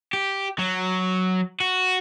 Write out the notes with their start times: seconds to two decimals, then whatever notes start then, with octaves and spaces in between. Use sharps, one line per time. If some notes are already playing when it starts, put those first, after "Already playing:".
0.13 G4
0.59 F#3
1.60 F#4